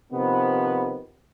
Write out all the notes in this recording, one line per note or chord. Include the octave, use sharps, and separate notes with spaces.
C3 D#3 F3 B3